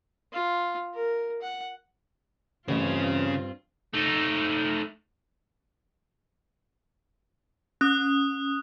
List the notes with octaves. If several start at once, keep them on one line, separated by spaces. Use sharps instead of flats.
F4
A#4
F#5
A1 G2 C#3 C4 C#4 F4
A3 D#4
C#4 D#6 F#6